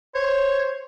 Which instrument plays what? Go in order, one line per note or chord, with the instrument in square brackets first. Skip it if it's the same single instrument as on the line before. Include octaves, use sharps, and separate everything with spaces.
[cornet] C5 [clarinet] C#5